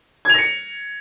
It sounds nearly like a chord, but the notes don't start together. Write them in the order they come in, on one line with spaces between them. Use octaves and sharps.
G#6 F7 A#6 C#7